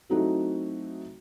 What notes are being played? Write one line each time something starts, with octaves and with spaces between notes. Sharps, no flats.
F#3 A3 C4 D#4 E4 F#4